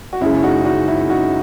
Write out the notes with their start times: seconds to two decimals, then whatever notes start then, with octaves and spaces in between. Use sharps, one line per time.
0.13 F#4
0.21 F#1 F#2 C#3 G#3 E4
0.43 D#4 F#4
0.65 D#4 F#4
0.88 E4
1.09 D#4 F#4